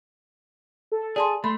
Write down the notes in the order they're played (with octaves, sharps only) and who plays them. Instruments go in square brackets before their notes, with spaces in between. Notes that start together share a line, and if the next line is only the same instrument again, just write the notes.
[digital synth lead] A4
[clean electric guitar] G#4 [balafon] D5 A5 C6
[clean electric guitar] A3 [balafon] B5 [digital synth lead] C6